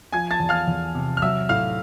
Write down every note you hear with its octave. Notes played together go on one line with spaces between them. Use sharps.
F3 G#5 G#6
A5 A6
E2
F5 F6
E2
C3
F6
F#3 E5 E6
A2 F5 F6